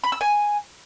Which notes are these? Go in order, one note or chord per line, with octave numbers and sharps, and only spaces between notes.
B5
E6
G#5